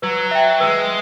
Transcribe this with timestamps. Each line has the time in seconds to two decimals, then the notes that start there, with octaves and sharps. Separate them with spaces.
0.02 F#3 B4
0.31 E5 G5
0.60 G#3 B4